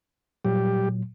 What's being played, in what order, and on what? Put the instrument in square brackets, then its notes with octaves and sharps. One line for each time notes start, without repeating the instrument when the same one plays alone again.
[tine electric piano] A#2 F#3 [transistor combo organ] G3 G4